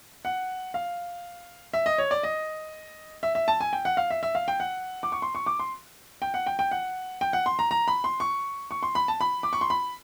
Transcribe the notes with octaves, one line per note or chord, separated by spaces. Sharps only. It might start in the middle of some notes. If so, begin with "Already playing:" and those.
F#5
F5
E5
D#5
C#5
D5
D#5
E5
E5
A5
G#5
G5
F#5
F5
E5
E5
F5
G5
F#5
D6
C#6
C6
C#6
D6
C6
G5
F#5
G5
G5
F#5
G5
F#5
C6
A#5
A#5
B5
C6
C#6
C#6
C6
B5
A5
B5
D6
C#6
C6
B5